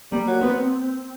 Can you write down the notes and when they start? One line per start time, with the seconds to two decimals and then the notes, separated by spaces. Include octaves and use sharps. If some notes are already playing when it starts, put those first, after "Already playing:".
0.12 G3 A#3
0.27 F#3
0.41 B3 C4